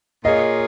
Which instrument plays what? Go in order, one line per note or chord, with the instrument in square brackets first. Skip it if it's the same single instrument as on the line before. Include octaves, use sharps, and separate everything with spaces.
[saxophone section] A#2 A#3 F4 G#4 C#5 [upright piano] D#5